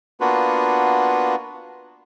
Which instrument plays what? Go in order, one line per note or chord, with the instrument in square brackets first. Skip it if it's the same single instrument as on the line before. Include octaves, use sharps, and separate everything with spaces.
[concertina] A#3 B3 D4 F4 F#4 B4